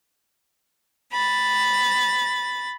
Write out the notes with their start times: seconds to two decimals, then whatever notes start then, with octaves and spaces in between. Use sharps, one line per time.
1.12 B5 A6